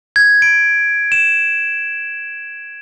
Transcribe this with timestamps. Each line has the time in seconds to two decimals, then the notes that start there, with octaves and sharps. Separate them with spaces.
0.16 G#6
0.42 D7
1.12 E7